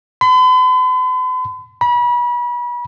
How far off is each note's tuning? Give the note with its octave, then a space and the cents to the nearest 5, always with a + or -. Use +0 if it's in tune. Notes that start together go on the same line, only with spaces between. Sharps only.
B5 +45
B5 -35